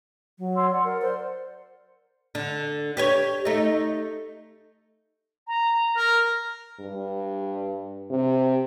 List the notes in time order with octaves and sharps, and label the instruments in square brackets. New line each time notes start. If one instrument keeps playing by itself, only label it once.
[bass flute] F#3
[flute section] C#5 C6 E6
D5 F#5
[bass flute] A#4
C5
[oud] D3
G4 B4 C#5
A3 D#4
[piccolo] A#5
[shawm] A#4
[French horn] G2
C3